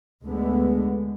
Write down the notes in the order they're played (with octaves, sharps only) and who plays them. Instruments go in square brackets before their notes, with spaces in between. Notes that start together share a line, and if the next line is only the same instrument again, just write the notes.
[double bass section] D2 D3 G#3 B3